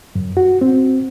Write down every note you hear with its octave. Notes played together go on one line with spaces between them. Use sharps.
F#2
F#4
C4